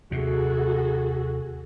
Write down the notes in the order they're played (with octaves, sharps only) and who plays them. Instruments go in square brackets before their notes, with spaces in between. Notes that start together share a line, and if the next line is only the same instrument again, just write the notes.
[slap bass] D#2 C3 [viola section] F#4 G#4 A4